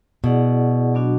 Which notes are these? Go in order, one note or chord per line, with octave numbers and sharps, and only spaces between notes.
B2 E4 G#4 D5 F#5
F#3 B3 D4 F#4